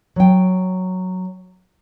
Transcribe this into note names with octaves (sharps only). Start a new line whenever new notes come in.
F#3 G5